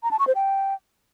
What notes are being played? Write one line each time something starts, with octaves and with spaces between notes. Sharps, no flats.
A#5
A5
C#6
C5
G5